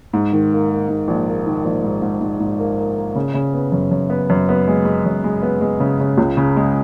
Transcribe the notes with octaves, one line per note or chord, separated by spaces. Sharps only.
G#2
D#3
A#3
A#3
G#2
A#1
A#3
D#3
A#1
G#2
G#2
G#2
G#2
A#3
A#3
A#3
C#3
C#3
B3
F#2
F#2
B3
F#2
B3
G#3
G#3
F#2
G#3
B3
G#3
C#3
C#3
C#2
C#3
G#3